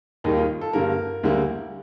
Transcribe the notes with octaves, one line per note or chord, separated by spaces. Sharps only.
D#2 D#3 G3 A#3 D#4
F4
A4
G2 D3 G3 A#3 A#4
D2 D3 G3 A#3